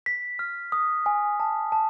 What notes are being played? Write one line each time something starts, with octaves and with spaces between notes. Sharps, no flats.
B6
F6
D#6
G#5
A5
A5